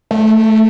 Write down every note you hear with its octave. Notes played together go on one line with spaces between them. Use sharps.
A3